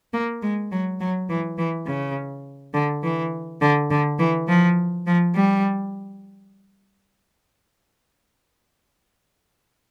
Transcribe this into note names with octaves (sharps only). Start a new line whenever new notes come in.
A#3
G#3
F#3
F#3
E3
E3
C#3
D3
E3
D3
D3
E3
F3
F3
G3